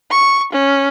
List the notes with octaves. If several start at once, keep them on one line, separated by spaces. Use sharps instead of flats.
C#6
C#4